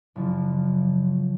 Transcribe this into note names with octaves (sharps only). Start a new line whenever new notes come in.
F#1 F#2 C#3 F3